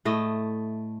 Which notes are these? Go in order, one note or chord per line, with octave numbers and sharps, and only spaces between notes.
A2 A3 D#5